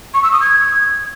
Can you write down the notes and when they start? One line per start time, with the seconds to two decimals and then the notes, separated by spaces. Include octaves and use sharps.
0.14 C#6
0.23 E6
0.32 D#6
0.41 G#6